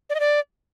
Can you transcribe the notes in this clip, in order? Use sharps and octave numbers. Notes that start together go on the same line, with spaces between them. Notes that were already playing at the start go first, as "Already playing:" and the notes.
D5
D#5
D5